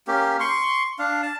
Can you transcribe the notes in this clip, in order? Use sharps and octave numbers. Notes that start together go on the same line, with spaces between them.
A#3 C#4 G4
C6 C#6
D4 F5
A5